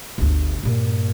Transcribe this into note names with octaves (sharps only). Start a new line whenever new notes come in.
G1 D2
G2 A#2